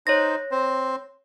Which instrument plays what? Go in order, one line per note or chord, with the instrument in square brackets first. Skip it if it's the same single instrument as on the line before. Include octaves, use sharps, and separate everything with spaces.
[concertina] D#4 C5 [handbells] C#5 A#6
[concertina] C4 C5